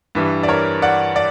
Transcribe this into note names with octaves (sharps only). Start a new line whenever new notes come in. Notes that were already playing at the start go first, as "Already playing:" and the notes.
G2 E3 G3
D5
A#4 C#5
D5 F#5
D5